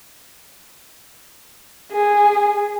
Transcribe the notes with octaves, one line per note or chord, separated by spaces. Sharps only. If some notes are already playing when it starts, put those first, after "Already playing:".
G#4